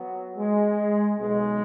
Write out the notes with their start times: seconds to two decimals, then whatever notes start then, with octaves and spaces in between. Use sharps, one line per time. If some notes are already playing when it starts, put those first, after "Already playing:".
Already playing: F#3 B3
0.36 G#3
1.18 B1 B2 G#3